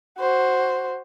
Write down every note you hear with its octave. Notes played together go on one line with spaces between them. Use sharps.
F#4 C5